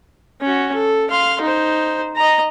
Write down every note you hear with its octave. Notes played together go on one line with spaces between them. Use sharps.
C#4 F#4
A4
F5 C6
D#4 C5
D#5 A#5